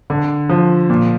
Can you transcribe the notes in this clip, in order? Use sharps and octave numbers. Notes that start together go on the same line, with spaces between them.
D3
F3
A#2